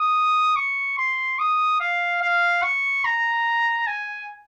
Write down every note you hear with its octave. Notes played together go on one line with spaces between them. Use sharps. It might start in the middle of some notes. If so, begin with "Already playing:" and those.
Already playing: D#6
C#6
C6
D#6
F5
F5
C#6
A#5
G#5